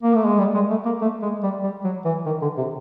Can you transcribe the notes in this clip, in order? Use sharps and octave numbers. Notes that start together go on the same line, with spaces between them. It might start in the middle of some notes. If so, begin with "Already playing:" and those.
A#3
A3
G#3
G3
G#3
A3
A#3
A3
G#3
G3
G3
F#3
E3
D#3
D3
C3